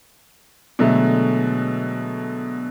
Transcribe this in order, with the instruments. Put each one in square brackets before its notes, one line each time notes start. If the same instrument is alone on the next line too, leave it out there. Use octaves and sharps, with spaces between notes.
[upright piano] B2 D3 F#3 G#3 A3